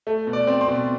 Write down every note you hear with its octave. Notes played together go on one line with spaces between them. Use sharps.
A3
B2
D5
C4
C6
B2